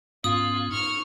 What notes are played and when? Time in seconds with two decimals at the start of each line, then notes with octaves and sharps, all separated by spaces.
0.24 G#2 B3 C#4 F4 D#6
0.71 D#4 C#6 F6